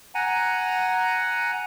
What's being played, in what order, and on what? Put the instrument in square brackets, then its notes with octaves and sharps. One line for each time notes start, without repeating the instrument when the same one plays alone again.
[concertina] F#5 G#5 A#5